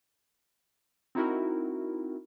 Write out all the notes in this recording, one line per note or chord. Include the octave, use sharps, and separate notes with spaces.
C4 D#4 E4 F#4 A#4